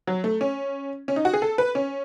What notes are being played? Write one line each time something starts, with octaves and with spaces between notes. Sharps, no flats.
F#3
A3
C#4
C#4
D#4
F#4
G#4
A4
B4
C#4